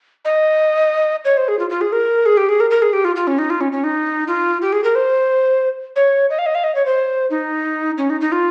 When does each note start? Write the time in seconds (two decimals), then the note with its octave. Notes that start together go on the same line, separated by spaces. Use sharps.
0.25 D#5
1.25 C#5
1.37 C5
1.48 G#4
1.59 F4
1.70 F4
1.81 G#4
1.92 A#4
2.26 G#4
2.37 G4
2.49 G#4
2.60 A#4
2.71 A#4
2.82 G#4
2.93 G4
3.05 F4
3.16 F4
3.27 C#4
3.38 D#4
3.50 F4
3.61 C#4
3.72 C#4
3.84 D#4
4.28 F4
4.62 G4
4.72 G#4
4.84 A#4
4.95 C5
5.96 C#5
6.30 D#5
6.39 F5
6.46 D#5
6.55 F5
6.64 D#5
6.75 C#5
6.86 C5
7.30 D#4
7.98 C#4
8.10 D#4
8.21 D#4
8.32 F4